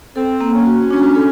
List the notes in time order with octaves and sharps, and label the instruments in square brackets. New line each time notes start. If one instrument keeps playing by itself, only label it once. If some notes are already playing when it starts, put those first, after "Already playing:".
[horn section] C4 [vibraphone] A4
[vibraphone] A#3
[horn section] C#4
[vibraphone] F#4
[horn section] C#4 [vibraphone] D4
[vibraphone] A4